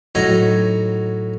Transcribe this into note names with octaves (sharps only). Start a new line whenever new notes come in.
A2 F#3 D#4 C#5 A#5